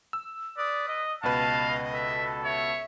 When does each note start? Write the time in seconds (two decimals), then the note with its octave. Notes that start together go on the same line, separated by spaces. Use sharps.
0.13 E6
0.58 B4 D5 D#6
0.88 D#5
1.23 C#2 B2 B4 D#5 F5 A5
1.94 A4 E5
2.44 C#5 E5